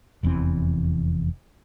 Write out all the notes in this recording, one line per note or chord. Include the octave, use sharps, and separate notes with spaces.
F1 E2 E3 C4